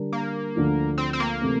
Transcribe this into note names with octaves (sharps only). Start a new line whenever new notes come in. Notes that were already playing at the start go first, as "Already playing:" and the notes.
Already playing: D3 G3 D4 G4 A#4
A#3
D2 D3 F3 A3 D4
C4
C4
A#3
C3 E3 A3